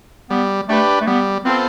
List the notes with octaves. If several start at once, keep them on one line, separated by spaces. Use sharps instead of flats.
G3 B3
A3 D4 G4 B4
A3
G3 B3
B3 C4 F4 A4 C5